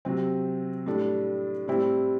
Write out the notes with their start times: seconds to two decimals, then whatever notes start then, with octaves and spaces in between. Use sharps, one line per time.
0.05 C3 F#3 C4
0.86 A2 G3 D4 A4
1.68 A2 G3 C4 E4